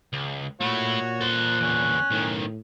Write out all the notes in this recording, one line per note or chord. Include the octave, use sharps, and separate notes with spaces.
C#2
A#2 A3 E4 F#4 C#5
A4 C5 F#6
E2 D3 C#4
B1 A2 D#3